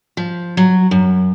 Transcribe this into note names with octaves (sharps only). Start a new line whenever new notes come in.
F3
F#3
F#2